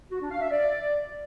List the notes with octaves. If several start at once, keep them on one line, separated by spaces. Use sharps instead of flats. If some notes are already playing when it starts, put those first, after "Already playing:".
F#4
D4
F5
E5
D5